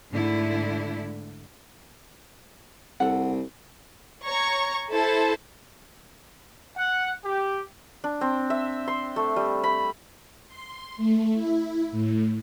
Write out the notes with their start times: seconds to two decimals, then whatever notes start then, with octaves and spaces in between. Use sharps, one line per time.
0.11 G#2 D3 A3 E4
3.00 C2 A4 F#5
4.24 C#5 A#5 C#6
4.92 E4 A4 C5 A5
6.76 F#5
7.24 G4
8.04 D4
8.21 C4
8.50 E5
8.88 C6
9.16 A3
9.36 G3
9.64 B5
10.48 C6
10.97 A3
11.34 E4
11.92 A2